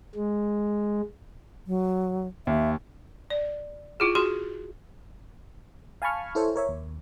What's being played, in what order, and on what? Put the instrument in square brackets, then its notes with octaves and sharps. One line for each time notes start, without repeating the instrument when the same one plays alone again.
[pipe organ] G#3
[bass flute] F#3
[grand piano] D#2 [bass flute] E5
[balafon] D5
E4 F4 G#4
F#4 G#4 C6
[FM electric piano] F5 G#5 A5 B5 C#6 F6
E4 A4 C5 C#5
A#4 C#5 E5
D#2